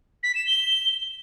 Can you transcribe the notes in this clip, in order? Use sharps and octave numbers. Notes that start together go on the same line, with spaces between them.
B6
E7
G7